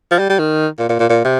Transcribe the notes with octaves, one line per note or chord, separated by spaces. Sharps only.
F3
G3
G3
D#3
A#2
A#2
A#2
A#2
C3